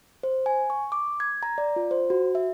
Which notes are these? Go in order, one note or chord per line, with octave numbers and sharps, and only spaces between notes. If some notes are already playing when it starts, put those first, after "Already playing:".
C5
G#5
C#6
D6
G#6
A#5
D5
F4
C5
F#4
E5